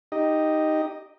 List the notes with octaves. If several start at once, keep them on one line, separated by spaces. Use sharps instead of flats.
D#4 G4 D#5